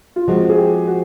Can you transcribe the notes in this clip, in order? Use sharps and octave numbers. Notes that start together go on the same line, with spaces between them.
F4
F3 G#3 C4 F#4
G#4
G4
F#4